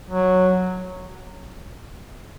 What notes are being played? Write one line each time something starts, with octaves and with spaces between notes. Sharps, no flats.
F#3